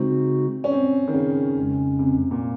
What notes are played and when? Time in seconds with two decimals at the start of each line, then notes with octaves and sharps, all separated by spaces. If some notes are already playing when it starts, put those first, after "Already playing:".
Already playing: C#3 G#3 C4 D#4 F#4
0.64 C#4
0.72 C4
1.08 D#3
1.14 C#3
1.56 F2 C#3 G#3 C#4
1.99 C3
2.31 A#2